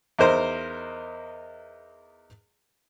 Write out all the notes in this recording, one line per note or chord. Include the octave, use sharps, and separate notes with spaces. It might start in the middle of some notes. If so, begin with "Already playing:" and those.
E2 D#4 A#4 C5 C6